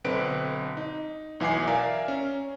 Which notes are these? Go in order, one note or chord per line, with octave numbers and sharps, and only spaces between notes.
B1 D3 C4 B4 D7
D#4
B1 E3 F#5 G#5 D6 C7
A#4 D5 E5 F5 G#5 A#5
C#4